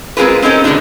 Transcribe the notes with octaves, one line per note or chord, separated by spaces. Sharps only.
G#3 C4 F4 G#4 A#4 B4
C4 C#4 D#4 A4 A#4
B2 D3 F#3 G#3 D4 D#4